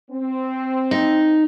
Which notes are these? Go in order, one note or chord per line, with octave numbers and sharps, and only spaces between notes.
C4
D#4